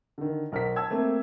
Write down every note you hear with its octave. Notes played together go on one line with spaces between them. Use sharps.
D3 D#3
B1 A#4 C5 B6
A5 E6 G#6
A3 A#3 C4